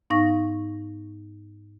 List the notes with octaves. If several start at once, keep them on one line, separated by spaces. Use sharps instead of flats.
G#2 B3 D#4 F5 C#6 A#6